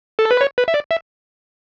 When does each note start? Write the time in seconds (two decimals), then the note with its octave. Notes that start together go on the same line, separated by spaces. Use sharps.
0.19 A4
0.31 B4
0.41 C#5
0.58 B4
0.68 E5
0.74 D5
0.91 E5